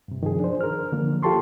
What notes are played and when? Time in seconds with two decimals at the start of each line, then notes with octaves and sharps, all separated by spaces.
0.08 G2 C3
0.23 D#3 F3 G#4
0.40 D4 C5
0.61 A#4 F6
0.92 D3 F3 A#3
1.23 F4 G4 A4 A5 C6 C#6